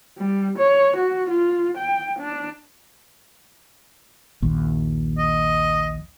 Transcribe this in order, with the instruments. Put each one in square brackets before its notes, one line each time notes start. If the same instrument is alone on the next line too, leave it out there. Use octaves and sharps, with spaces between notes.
[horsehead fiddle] G3
C#5
F#4
F4
G5
D4
[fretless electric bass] A#1 D#2
[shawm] D#5